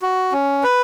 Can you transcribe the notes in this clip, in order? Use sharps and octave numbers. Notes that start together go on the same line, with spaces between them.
F#4
C#4
B4